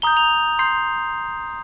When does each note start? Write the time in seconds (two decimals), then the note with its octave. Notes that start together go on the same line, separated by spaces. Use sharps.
0.02 A#5 D#6 G6 G7
0.17 F7
0.59 C6 G6 C7